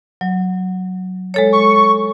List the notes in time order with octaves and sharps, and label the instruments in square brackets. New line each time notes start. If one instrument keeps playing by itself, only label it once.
[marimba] F#3
G#3 A4 C#5
[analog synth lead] C#6